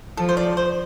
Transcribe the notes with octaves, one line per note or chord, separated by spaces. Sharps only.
F3 A4
C5
D5
C5